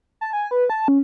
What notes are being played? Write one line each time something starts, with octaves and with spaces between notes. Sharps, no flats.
A5
G#5
B4
A5
C#4